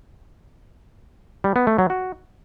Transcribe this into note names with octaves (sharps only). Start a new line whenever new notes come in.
G3
B3
A3
F#3
F#4